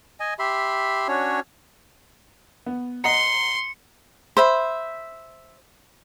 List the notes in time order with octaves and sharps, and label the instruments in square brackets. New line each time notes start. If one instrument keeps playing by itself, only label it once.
[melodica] D#5 G#5
G4 E5 B5 C6
C#4 D4 F#4 C#5
[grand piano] B3
[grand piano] D#5 F#5 A#5 [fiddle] C6 [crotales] C#7
[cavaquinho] C5 E5 B5